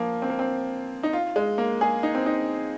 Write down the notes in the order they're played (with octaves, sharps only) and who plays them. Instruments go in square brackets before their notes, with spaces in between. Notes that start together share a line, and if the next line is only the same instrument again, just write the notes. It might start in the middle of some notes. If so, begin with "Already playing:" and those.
Already playing: [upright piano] F3 A#3
C4
A#3
C4
D#4
F4
G#3
A#3
G#4
D#4
C4
D#4